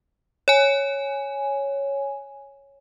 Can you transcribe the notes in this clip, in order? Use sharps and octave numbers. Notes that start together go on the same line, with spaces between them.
C#5 G#5